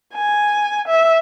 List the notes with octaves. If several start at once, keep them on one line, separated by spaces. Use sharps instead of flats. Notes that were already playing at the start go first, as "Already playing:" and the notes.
G#5
E5